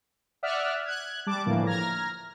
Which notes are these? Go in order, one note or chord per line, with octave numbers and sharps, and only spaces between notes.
D5 E5 F#5 D#6 F6 F#6
F#6 G#6
G3 A5 D6
A2 D3 E3 F3 A#3
A#5 F6 G#6 A#6